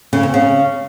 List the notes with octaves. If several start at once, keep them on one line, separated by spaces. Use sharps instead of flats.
C#3
C4
C#3